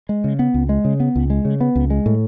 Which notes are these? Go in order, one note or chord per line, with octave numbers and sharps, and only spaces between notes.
G#3
C#3
B3
C#2
G#3
C#3
B3
C#2
G#3
C#3
B3
C#2
G#3
A2